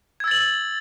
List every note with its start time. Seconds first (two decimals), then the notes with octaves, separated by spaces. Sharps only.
0.20 G#6
0.24 E6
0.28 A6
0.31 F#7